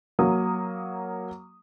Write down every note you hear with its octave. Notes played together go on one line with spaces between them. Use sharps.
F#3 A#3 D#6